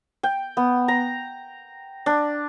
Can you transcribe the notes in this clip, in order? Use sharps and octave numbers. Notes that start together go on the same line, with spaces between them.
G5
B3
A#5
D4